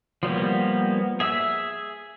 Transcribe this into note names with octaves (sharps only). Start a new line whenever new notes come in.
F3 G3 A#3 B3
G#4 E5 E6